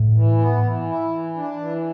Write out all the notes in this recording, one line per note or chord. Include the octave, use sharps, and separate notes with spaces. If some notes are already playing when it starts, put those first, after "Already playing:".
Already playing: A2
E3
B3
E3
E4
E3
D4
E3